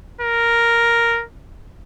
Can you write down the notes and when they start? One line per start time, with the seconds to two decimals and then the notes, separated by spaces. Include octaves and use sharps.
0.21 A#4